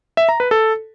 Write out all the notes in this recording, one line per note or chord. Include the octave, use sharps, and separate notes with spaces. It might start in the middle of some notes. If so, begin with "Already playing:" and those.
E5
A#5
B4
A4